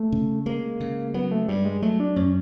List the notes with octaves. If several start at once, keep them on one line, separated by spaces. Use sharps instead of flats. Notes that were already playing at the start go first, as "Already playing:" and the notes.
Already playing: A3
C#3
G#3 A#3
C#3
F#3 B3
A3
G2 G3
G#3
F#3 A3
D4
F#2 C#4